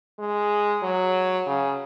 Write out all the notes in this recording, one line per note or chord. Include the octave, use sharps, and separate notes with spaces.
G#3
F#3
C#3